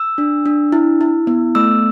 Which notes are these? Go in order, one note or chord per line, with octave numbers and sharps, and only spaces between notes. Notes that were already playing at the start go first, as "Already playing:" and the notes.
Already playing: E6
D4
D4
E4
E4
B3
A3 E6